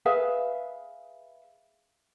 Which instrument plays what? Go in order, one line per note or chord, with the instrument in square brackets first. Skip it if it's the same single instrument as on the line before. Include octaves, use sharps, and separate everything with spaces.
[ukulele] G#4 B4 E5 F5